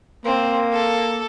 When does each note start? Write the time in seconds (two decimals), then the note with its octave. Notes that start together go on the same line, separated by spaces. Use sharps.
0.25 A#3 C4
0.73 A4